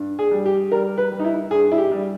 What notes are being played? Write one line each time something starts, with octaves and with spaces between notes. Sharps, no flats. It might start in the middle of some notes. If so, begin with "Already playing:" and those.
Already playing: G2
G#4
G3
G4
G3 A#4
B4
G3
D#4
E4
G2 G#4
E4
G4
G3